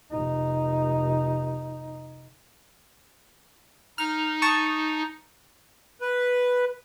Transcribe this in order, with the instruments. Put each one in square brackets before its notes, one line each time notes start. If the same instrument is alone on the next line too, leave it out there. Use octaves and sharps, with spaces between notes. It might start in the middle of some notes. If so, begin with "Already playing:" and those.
[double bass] F1 D#4
[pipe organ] D#4 [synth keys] F6
[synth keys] A5 C#6 D#6
[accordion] B4